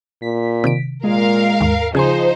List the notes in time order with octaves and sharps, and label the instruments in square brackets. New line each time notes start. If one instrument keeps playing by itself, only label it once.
[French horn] A#2 [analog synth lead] B6
[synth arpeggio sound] C3 D#3 D7
[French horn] A#2 [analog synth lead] G#3 [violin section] A#4 F5
[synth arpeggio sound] D#2 G#2
[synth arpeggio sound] C#3 G#5 C6 [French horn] F3 [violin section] D#4 C5 [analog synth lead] G#4